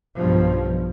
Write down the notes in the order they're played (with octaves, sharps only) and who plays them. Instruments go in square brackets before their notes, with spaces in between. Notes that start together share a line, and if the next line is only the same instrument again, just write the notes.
[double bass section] B1 G2 B2 F3